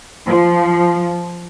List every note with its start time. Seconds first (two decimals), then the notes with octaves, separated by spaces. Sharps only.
0.28 F3